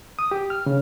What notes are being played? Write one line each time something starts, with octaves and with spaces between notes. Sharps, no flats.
D#6
G4
F6
C#3